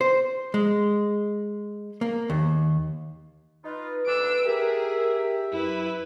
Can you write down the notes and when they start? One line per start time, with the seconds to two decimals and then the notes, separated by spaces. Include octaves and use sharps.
0.01 C5
0.54 G#3
2.01 A#3
2.30 D#2
3.64 D#4 F4 B4
4.06 D2 D4 E6 D7
4.46 G4 G#4 A#4 E5
5.52 F#2 E4 B4